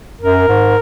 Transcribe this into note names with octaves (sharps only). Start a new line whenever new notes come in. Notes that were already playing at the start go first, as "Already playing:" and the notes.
F#2 A#4
G#2